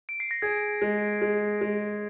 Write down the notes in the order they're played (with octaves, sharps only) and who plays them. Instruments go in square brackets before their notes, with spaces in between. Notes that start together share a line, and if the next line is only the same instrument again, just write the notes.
[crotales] D7
C7
A#6
[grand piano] G#4 [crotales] G#6
[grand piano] G#3
G#3
G#3